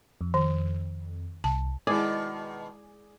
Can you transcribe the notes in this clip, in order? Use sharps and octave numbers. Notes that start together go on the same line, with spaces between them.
F2
D#3
C2 A5
B2 D#3 G#3 E4 G#4 D5